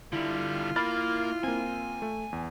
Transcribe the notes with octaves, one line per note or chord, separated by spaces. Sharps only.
D3 G3 E4 F4
A#3 B5 F6 A6
A#3 C4 G#5
A3
E2